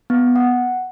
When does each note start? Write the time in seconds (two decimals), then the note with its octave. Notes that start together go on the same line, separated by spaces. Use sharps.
0.10 B3
0.36 F#5